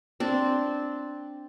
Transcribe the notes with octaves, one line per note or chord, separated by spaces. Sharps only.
C4 D4